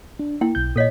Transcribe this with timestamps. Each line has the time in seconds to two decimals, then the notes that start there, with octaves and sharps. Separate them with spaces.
0.19 D4
0.41 A#3 E4 G5
0.55 B1 G6
0.76 A#2 A4 C#5 D#5 B6